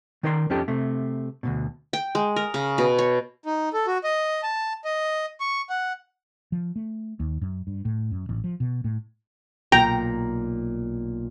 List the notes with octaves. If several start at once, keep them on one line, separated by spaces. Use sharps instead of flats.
D#3 D#4 A#4 D5 D#5 C6
F2 F3 C#4 D#4 G4 A4
C3 A3
D2 G2 B2
G5
G#3
A#4
C#3
B2
C#5
D#4
A4
F#4
D#5
A5
D#5
C#6
F#5
F3
A3
D#2
F#2
G2
A2
F#2
A1
F3
B2
A2
B1 A#2 G5 A#5